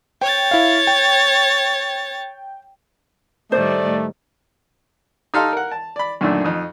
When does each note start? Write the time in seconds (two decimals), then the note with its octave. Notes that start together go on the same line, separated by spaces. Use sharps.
0.22 C#5 G5 A6
0.51 E4 F5
0.87 G5
3.52 A2 D#3 G3 A3 C5 D5
5.34 D#4 G4 A4 F5 A#5 C6
5.53 A#4 F#5
5.71 A5
5.96 D5 B5
6.21 F#2 A#2 D3 D#3 A3 D4
6.44 F2 D#4